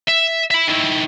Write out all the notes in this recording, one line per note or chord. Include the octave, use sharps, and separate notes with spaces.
E5
E5 B5
D#3 E4